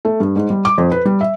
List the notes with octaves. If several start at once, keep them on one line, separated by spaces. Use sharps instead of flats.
A3
G2
G#2
G3
D6
F2
B4
G3
E5